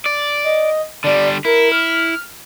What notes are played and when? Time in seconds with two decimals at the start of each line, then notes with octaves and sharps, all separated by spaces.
0.06 D5
0.44 D#5
1.04 D3 G3 D5
1.45 E4 A#4
1.72 F6